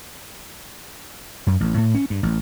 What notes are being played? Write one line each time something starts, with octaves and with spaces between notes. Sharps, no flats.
F#2
A1
A2
C#4
G2
A1